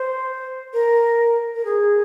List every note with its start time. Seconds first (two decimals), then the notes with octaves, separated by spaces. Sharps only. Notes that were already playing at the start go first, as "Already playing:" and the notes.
Already playing: C5
0.73 A#4
1.55 A#4
1.65 G#4